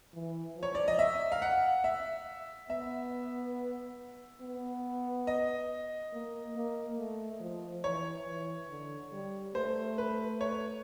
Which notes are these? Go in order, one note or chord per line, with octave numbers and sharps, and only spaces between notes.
E3
F3
C#5
D5
D#5
E5
F5
F#5
E5
B3 E5
B3
D#5
A#3
A#3
A3
F3
E3 C#5
E3
D3
G3
A3 C5
B4
C#5